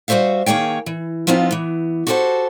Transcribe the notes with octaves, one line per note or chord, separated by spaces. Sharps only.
G3 F#4 G4 C5 E5 F5
D#3 A#3 G#4 C#5 G5
E3
F3 B3 C4 D#4 F4
E3 B3
F#4 G4 A4 B4 C5 F#5